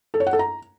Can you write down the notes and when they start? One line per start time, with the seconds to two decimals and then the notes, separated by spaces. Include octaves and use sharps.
0.14 A4
0.20 C#5
0.27 F#5
0.33 A4
0.39 A#5